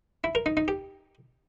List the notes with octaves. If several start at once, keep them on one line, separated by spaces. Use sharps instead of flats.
E4
A#4
D#4
D#4
G4